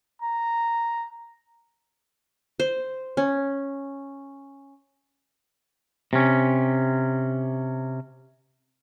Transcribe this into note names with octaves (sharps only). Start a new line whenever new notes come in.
A#5
C5
C#4
C3 C#4